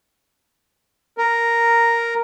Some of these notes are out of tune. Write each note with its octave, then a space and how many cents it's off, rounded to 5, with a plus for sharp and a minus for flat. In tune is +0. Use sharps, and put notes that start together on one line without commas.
A#4 +0